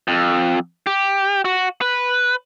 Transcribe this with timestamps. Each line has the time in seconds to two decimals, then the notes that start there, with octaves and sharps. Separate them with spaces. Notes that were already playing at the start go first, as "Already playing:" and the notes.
0.08 F2
0.87 G4
1.45 F#4
1.81 B4